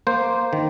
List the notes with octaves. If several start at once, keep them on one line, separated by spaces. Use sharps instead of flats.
A#3 C5
D#3